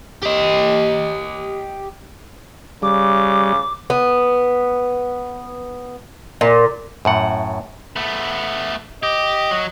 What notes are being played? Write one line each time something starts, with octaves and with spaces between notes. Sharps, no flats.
G4 D#5
C#3 G3 D6
B3
A#2
F#2 A2 F#5
A3 B3
G4 D#5
F#3